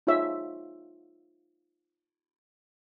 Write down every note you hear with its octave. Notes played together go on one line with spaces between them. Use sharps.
D#4 F4 G#4 C#5 E5